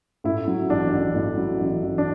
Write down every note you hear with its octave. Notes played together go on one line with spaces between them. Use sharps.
A2 E4
F#3
A1 D4
A1
A2
F#3
A1
A1
D4